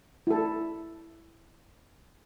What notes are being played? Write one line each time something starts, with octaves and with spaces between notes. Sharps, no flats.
E4 A4